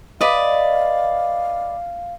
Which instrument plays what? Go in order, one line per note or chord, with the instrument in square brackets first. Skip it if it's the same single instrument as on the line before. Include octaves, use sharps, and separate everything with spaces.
[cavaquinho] B4 D5 D#5 [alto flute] F5